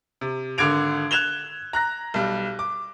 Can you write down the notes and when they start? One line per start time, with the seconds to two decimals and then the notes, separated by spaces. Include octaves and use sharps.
0.21 C3
0.58 G#1 D3 D6 G#6 D7 F7
1.11 F#6 G#6 E7 F7 G7
1.73 A#5 F#6 A#6
2.14 B1 G3
2.59 D6